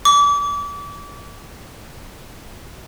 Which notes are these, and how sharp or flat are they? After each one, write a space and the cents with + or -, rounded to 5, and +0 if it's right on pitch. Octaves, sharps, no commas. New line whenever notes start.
D6 -35